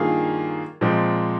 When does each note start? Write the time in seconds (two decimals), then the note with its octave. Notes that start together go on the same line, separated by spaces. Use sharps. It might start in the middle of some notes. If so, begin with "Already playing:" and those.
Already playing: G2 D#3 A#3 F4 G#4
0.81 A#2 F3 G#3 C4